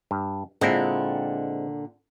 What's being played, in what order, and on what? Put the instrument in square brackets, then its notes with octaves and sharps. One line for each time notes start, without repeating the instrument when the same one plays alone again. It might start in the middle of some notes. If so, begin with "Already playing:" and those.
[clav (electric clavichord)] G2
[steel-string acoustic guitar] A#2 D3 [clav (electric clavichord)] G#3 C4 E4